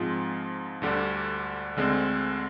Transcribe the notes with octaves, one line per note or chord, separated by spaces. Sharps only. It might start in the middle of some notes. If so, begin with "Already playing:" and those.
Already playing: G#2 F3 G#3 C4 F4
D2 D3 G3 D4
D2 D3 G#3 C4